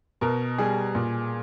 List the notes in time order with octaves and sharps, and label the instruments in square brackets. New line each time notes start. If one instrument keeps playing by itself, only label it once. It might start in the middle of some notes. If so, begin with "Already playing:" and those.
[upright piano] B2 A#4
G3 G#4
A#2